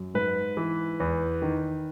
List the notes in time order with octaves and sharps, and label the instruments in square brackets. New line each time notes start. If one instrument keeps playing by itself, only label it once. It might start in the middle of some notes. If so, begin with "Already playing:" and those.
Already playing: [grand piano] F#2
G#2 B4
E3
E2
D#3